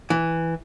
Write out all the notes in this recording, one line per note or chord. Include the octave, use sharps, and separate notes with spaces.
E3